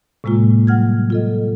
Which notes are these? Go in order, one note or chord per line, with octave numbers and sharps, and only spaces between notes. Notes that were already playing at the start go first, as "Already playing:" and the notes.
A2 C3 G#3 A#3 F4
F#3 G3 F#5 F6 G#6
F4 A4 D#5